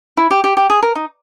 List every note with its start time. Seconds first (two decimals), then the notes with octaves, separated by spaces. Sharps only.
0.17 E4
0.31 G4
0.44 G4
0.57 G4
0.70 G#4
0.83 A#4
0.95 D#4